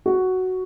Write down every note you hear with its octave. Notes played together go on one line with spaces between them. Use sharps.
F#4